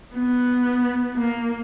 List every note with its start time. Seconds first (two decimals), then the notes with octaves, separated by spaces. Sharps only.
0.14 B3
1.16 A#3